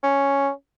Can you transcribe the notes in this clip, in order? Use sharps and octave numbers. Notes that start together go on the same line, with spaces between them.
C#4